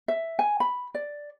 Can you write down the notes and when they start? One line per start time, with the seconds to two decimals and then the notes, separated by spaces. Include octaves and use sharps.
0.08 E5
0.39 G#5
0.60 B5
0.95 D5